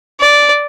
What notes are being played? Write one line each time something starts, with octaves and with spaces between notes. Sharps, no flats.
D5